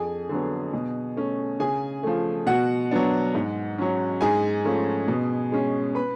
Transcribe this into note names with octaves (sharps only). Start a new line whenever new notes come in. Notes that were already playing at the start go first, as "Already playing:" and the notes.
Already playing: F2 G#4 G#5
D3 F#3 B3
B2
A3 C#4
C#3 G#4 G#5
F3 A3
B2 F#4 F#5
F#3 B3 D4
G#2
F#3 C#4
G#2 G#4 G#5
F3 A3 C#4
B2
G#3 C#4
B4 B5